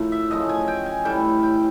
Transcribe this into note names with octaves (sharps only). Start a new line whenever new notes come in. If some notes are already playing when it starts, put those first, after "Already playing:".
Already playing: A2 F3 A3 A#4
E5
F#2 C#3 F3 A3 D#5
G#5
G5
G#5
A2 E3 G3 G5
G5